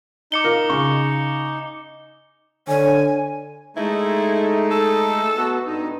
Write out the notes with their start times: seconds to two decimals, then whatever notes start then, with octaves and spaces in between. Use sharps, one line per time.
0.32 D#4 D6 C#7 G7
0.44 F4 A#4
0.69 C#3 C#6
2.68 D3 C#5 G#5
3.77 G#3 A3 D#4 E4
4.71 A4
5.37 B3 F#4
5.66 G2 D#4